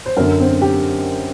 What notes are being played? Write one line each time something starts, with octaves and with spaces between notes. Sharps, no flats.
C5
F#2 D3 A#4
C4
G4